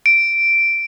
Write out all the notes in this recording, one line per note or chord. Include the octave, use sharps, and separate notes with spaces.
D7